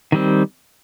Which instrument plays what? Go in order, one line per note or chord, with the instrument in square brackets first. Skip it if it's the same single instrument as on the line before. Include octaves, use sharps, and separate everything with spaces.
[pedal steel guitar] D#3 G3 C4